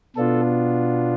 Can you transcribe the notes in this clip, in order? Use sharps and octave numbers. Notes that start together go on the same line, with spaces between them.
B2 B3 D4 F4 A4